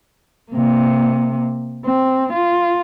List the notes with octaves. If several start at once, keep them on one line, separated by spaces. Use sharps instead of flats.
C3 A#3
C4
F4